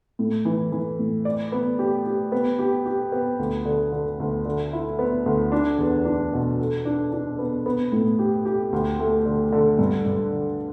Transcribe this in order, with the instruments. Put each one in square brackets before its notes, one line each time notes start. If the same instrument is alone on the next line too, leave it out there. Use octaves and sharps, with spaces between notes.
[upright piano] A2
E3
E3
A2
D5
B3
G4
G4
B3
G4
G4
B3
D2
D3
D3
D2
D3
E4
B3
D2
D4
E2
D4
B2
A4
D4
D4
B3
B3
A2
G4
G4
D2
A3
D3
D3
G2
G2
D3